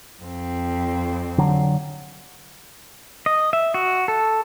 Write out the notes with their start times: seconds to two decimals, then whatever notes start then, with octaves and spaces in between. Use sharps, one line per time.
0.23 F2 C4
1.38 D3 F#3
3.26 D#5
3.53 E5
3.74 F#4
4.08 A4